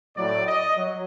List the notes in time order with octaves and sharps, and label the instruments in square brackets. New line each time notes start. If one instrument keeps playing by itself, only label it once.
[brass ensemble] A2 F#3 D5
D#5
F#3